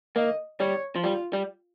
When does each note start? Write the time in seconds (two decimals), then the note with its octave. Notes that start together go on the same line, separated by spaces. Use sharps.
0.16 A#3 D#5
0.60 G3 C#5
0.96 F3
1.04 G3 F4
1.33 G3